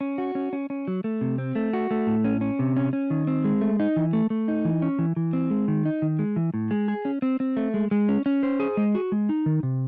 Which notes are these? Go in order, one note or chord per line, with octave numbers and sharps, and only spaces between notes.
C#4
F#4
C#4
C#4
C#4
F#3
A3
C3
C4
A3
F#4
A3
A2
C#4
C#4
C3
C#4
C#4
D#3
C4
G#3
A3
D#4
E3
A3
A3
D#4
E3
C#4
E3
E3
C4
G#3
D#3
D#4
D#3
G#3
E3
A2
G#3
G#4
C#4
C4
C4
A3
G#3
G#3
C#4
C#4
C5
G#4
G#3
F#4
G#3
D#4
D#3
C3